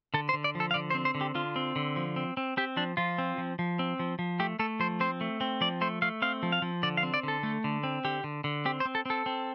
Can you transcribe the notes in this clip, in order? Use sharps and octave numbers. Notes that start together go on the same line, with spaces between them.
D3 A4
C5
D3
D5
F3
A4
F5
D3 D5
C5
C4
C5
D3
G4
D3 F4
C4
D3
F3
C4
C4
C4 G4
F3 D4
F3 F4
C4
F3
F3
C4
F3
F3
A3 G4
A3 A4
F3 C5
C4 C5
A3
C4
F3 D5
A3 C5
A3 F5
C4 F5
F3
F5
F3
D3 D5
F5
C4
D5
D3 A4
A3
D3
C4
D3 G4
D3
D3
C4 G4
C5
C4
A4
C4 A4
C4